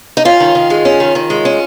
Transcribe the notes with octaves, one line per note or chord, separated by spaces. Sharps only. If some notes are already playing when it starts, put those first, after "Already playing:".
D#4
C#4 F4
D#3
D#3
G#3
C#4
D#3
D#3
G#3
C#4